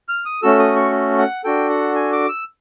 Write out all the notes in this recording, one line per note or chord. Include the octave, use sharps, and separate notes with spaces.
F6
D#6
A3 C#4 F#4 A4 E6
D#6
C#6
F#5
D4 F#4 A4 G5
F#5
G#5
D6
E6